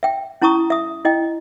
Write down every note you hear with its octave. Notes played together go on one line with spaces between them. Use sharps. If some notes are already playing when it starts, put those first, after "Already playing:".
E5 G5
C#4 E4 A5 A#5 C#6 D#6
E5 D#6
E4 D#5 G5